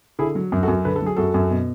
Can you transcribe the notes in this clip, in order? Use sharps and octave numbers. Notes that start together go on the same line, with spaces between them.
D3 E4 G#4
F#3
F#2
F#4 A4
F#2
D3 B4
A4
F#3 G#4
F#2 F#4 A4
F#2
B2